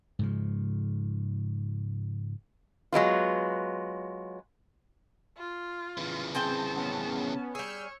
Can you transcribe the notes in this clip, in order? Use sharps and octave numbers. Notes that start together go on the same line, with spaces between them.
G#2 C#3 F3
F#3 G#3 B3 F4
F4
C#3 E3
C4 G#4 G5 A5
B3 C#4
G3 G#4 C#5 E6 F6 G6